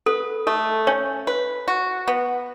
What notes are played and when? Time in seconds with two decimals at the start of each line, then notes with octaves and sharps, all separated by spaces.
0.06 A4 B4
0.47 A3 A4
0.87 C#4 C#5
1.27 B4
1.68 F#4
2.08 B3